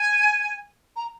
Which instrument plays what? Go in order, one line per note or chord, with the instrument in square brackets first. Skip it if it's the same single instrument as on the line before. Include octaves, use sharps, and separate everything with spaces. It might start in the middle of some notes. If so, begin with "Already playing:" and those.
Already playing: [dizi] G#5
A#5